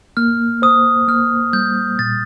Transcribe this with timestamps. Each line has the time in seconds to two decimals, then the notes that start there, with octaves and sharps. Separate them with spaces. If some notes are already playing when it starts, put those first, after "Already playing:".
0.17 A#3 F6
0.62 C5 D#6
1.08 A#3 F6
1.53 G3 G6
1.99 A#2 A6